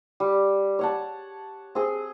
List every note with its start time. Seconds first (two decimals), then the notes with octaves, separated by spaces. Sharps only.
0.20 G3
0.79 C#5 F#5 A5
1.75 C4 G#4